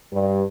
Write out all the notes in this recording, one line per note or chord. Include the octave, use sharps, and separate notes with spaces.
G2